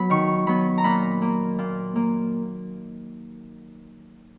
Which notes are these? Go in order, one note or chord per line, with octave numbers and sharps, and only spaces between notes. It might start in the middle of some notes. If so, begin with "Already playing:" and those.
Already playing: F#3 B3 B5
D#3 C#6
F#3 B3 B5
A#5
A#2 B5
A#3
A#2
A#3